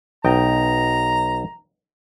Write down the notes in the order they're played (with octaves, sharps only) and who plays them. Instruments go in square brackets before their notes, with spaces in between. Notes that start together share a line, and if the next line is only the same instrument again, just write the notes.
[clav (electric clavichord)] B1 D#5 G5 [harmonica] A#5